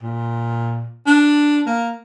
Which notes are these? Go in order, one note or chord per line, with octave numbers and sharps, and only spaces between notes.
A#2
D4
A#3